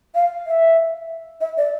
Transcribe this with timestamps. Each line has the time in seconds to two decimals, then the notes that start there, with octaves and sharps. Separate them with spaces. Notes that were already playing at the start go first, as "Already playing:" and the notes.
0.15 F5
0.47 E5
1.41 E5
1.58 D5